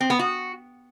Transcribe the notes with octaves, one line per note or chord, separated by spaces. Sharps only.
C4
B3
F#4